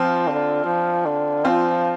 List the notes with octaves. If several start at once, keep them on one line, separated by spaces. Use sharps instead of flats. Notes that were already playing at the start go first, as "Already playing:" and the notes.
Already playing: F3 C4 F4
D3
F3
D3
F3 C4 F4